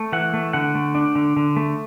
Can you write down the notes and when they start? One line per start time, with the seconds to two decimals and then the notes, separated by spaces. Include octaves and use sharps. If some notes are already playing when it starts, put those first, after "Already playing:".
Already playing: A3
0.12 E3 F#5
0.34 A3
0.53 D3 F#5
0.75 A3
0.95 D4
1.15 D3
1.37 D3
1.57 A3